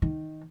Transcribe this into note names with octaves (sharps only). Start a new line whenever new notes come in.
D#3